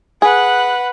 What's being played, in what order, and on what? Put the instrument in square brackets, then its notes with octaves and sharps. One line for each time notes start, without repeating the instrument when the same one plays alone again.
[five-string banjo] G#4 [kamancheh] B4 F#5